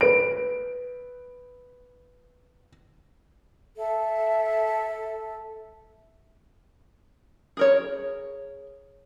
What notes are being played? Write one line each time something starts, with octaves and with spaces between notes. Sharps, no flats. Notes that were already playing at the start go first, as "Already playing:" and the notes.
B4 D7
A4 E5
G#4 A#4 C#5